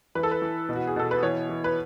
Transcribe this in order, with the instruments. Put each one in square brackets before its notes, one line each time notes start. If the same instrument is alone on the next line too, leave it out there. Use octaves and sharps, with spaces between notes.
[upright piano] E3 B4
A4
B4
E3
B2
F#4
G#4
B2 A4
B4
E3 C#5
E3
B4